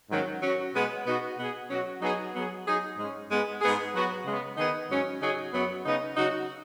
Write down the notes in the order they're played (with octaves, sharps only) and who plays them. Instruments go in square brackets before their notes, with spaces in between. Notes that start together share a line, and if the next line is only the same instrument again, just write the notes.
[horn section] G#2 D#3 F#3 C#4
F#3 C#4 F#4
B2 G#3 B3
B2 B3 D#4 F#4
B2 B3 G#4
B2 F#3 C#4 F#4
F#3 B3 D#4 G#4
F#3 B3 G#4
F#3 D#4 G#4
G#2 G#3 C#4
G#2 G#3 B3 G#4
G#2 G#3 B3 G#4
F#3 B3 F#4
C#3 G#3 B3
D#3 B3 D#4 G#4
G#2 F#3 C#4
C#3 F#3 D#4 G#4
F#2 F#3 B3
C#3 B3 D#4
C#3 F#3 D#4 F#4